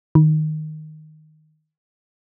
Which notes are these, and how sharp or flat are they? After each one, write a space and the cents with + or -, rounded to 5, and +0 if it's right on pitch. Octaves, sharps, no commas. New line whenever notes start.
D#3 -5